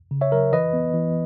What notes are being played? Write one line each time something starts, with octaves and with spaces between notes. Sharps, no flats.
C#3
C#5 E5
F#3 A#4
E3 B4 D#5
B3
E3